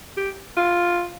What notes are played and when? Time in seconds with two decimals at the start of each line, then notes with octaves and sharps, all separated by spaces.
0.17 G4
0.57 F4